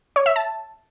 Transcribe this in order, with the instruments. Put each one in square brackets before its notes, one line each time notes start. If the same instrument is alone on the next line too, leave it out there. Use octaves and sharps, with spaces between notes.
[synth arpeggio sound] C#5
E5
A5